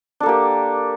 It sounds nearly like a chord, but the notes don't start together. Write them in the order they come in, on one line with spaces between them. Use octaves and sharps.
D4 A4 A#3 G4